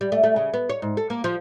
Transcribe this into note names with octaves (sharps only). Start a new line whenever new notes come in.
G3
A3
A3
C#3
B3
C#5
G#2
A4
A#3
F3